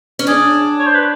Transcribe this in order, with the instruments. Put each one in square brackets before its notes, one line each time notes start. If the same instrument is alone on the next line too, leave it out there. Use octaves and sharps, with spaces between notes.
[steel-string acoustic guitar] C#4
[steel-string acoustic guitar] D4 [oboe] G#4
[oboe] C#5
C5
B4